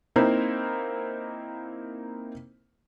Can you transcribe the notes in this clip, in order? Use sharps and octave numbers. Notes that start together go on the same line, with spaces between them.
A#3 C4 D#4 E4 A#4 C5